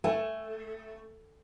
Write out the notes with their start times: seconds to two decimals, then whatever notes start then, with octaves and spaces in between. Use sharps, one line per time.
0.04 A3 G#5